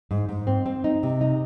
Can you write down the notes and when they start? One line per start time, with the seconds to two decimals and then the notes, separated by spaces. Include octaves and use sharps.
0.11 G#2
0.29 G#2
0.47 C4
0.66 C4
0.84 D#4
1.03 C3
1.21 D#4